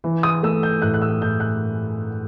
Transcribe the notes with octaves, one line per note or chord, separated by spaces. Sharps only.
E3
D#6
A3 E6
G6
A2 F#6
F#6
E6
A2 G6
F#6